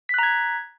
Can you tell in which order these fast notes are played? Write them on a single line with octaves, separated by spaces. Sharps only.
B6 F#6 A#5 G#6